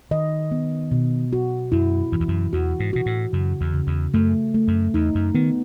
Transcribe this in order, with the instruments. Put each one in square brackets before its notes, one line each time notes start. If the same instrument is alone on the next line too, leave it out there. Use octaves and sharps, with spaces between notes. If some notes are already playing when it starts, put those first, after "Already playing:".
[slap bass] D#3 [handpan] D#5
[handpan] B3
B2
F#4
[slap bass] F#2 [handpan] E4
[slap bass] F#2 [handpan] E3
[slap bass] E2
F#2
[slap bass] E2 [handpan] F#4
[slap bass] G#2
[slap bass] B2 [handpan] F#4
[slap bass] A2
[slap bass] F#2 [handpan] C#3
[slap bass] E2
[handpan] C#3
[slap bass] E2
[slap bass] F#2 [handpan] A3
[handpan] A3
[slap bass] F#2
[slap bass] E2 [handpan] D#4
[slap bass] F#2
[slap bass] D#3 [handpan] B3